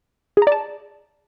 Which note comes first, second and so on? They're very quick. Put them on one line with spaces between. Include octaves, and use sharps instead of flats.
G#4 A#5 D5 A5